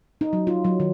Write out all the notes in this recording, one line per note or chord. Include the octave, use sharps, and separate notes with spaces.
D#4
F#3
F4
F#3
D#3